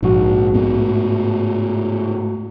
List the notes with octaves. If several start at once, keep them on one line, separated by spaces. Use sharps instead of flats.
A#1 G#2 F#4
A2 B3